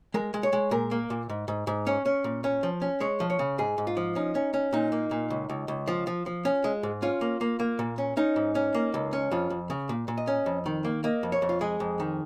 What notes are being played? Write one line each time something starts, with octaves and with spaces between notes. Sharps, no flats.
G#3 A#4
G#3
C#5
G#3
A#2 A#4
A#3
A#2
G#2
G#2
G#2
C#4 C#5
C#4
A#2
C#4
F3
C#4
G#3 C#5
F3
C#5
C#3
G#2 G#4
G#2
F4
F3
C#4 D#4
C#4
C#4
A#2 D#4
A#3
A#2
C#2
C#2
C#2
F3 F4
F3
F3
C#4
G#3
G#2
C#4 F4
A#3
A#3
A#3
A#2
C#4
C#4 D#4
G#2
C#4
A#3
C#2
C#4
F2 F4
F2
C#3
A#2
A#2
D#5
C#4
F2
D#3
A#3
A#3 D#5
F2
C#5
F2
F4
G#3 G#4
F2
D#3